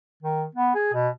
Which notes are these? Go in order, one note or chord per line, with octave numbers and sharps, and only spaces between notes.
D#3
B3
G#4
B2